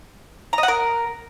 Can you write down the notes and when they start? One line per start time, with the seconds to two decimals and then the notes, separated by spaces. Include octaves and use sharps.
0.53 A#5
0.58 D#5
0.63 F#5
0.68 A#4